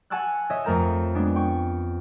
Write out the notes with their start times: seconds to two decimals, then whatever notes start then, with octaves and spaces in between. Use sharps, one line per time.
0.10 F#5 G#5 A5 C#6 E6 F#6
0.50 C#5 D#5 E5
0.64 F2 A3 A#4 A#5 G6 E7
1.15 G#3 B3 D4
1.35 G5 C#6